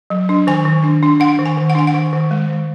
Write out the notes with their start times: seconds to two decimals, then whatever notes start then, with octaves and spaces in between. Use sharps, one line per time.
0.10 F#3
0.29 D4
0.47 D#3 G#5
0.66 D#3
0.84 D4
1.03 D4
1.20 D4 F#5
1.39 D#3
1.46 G#5
1.58 D#3
1.70 F#5
1.75 D4 G#5
1.87 F#5
1.94 D#3
2.13 D#3
2.31 G#3
2.49 D#3